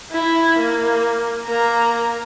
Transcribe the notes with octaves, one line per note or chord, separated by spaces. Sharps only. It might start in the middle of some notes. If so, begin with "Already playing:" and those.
E4
A#3
A#3 A#5